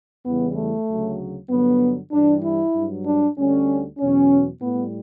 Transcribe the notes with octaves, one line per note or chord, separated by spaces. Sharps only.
E2 C#3 E3 G3 B3
A3
D2 C#3 F#3
G2 D3 F#3 B3
G2 E3 G3 D4
E4
G2 F#3
D4
D2 D3 G3 C#4
E2 B2 F#3 C#4
A2 G3 B3